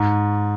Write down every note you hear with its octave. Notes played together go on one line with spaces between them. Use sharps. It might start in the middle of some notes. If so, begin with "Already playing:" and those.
Already playing: G#2